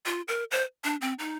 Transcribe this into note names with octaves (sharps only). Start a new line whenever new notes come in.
F4
A#4
C5
D4
C4
D#4